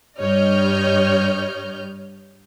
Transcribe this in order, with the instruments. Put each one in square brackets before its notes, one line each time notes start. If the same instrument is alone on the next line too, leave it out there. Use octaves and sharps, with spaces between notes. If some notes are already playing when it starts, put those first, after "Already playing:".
[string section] G2 G3 C#5 D#5 F6 G6